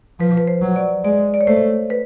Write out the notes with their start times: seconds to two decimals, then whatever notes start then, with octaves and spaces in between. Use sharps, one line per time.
0.20 F3 B4
0.37 B4
0.48 C5
0.62 F#3
0.76 D5
1.04 G#3 D5
1.34 D5
1.41 C#5
1.47 A3 C5
1.90 B4